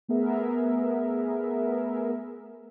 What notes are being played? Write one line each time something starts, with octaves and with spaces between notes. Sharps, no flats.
A3 B3 G#4 A#4 E5